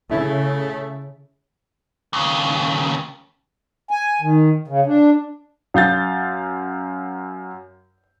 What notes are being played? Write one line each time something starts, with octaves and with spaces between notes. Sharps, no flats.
C#3 A3 E4
D#2 C#3
G#5
D#3
C#3
D4
F#2 F5 G6 A6